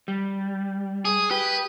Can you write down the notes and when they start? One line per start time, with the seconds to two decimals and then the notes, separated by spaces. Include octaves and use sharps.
0.08 G3
1.05 G#4
1.31 G4 B4